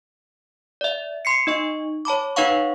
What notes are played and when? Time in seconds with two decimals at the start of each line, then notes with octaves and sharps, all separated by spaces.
0.81 D5 E5
1.25 C6 C7 C#7
1.47 D#4 D#5 C#6
2.05 C#5 A5 B5 D6
2.36 D#4 B4 C#5 F5 F#5 C#6